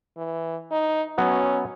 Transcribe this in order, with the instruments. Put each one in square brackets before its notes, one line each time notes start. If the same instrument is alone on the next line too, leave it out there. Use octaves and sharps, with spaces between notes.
[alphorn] E3
D#4
[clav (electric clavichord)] F#3 B3 [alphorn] C#4